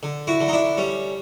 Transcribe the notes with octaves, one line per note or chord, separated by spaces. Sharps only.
D3
E4 F#4
D3
D#4
D4 E4
G3 C#4